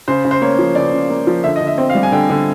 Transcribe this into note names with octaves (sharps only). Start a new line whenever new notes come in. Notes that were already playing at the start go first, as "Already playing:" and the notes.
C#3 C5
C#3
C5
A#3 C#5
F3
C#3 D5
C#3
A#3
F3
D3 E5
D#5
D3
E5
C4
F5
G3
G#5
D3 G5
D3